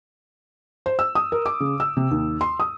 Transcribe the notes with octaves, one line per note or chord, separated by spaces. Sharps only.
C5
E6
D#6
A#4
D6
C#3
E6
C3
D#2
C6
D#6